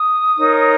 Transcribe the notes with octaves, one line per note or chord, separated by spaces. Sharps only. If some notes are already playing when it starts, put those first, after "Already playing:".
Already playing: D#6
D#4 A#4 C#5